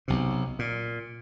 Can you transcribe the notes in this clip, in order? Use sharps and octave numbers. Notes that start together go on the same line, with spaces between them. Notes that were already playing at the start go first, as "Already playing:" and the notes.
B1 C3
A#2